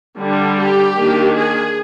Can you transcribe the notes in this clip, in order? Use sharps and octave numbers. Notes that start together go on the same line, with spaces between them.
D3 G3 D4
G4
D#3 A#3 D4
G#4